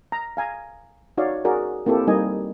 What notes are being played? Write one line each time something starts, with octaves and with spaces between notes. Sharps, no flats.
A#5
F5 G#5 A#5
D#4 F#4 C#5 D5 F5
F#4 G#4 A#4 D5
A#3 C4 E4 G4 A4
G3 A#3 D#4 D#5 G#5